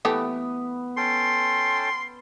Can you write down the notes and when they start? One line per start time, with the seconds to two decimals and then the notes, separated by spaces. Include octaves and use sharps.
0.05 E3 A3 B3 G4
0.97 C#4 A4 G5 C6